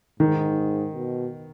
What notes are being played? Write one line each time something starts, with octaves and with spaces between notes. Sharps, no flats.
G#2 D#3
B2